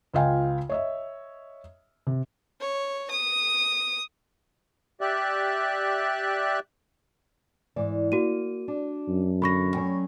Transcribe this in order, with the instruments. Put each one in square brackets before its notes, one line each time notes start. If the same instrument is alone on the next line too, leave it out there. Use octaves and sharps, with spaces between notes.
[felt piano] C#2 F4 D#5 F5 G5 G#5
C#5 D#5 E5
C3
[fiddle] C#5
D#6
[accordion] G4 D5 E5 F#6
[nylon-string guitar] G#2 E3 D5
[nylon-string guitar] A#3 [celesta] F#4 D#7
[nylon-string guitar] D4
[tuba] F#2
[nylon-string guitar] D3 [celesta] B5 C#6 A#6
[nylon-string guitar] F#3 C#4 G5